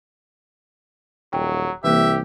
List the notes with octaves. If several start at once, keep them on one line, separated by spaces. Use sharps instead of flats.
D#1 F#3 G5
C2 E3 A#3 G4 E5